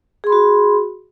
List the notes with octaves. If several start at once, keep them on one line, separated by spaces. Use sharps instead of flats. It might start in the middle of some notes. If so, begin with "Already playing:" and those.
F#4 G#4 B5 C6